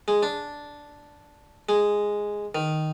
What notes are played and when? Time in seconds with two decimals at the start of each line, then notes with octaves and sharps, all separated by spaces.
0.08 G#3
0.23 D4
1.69 G#3
2.55 D#3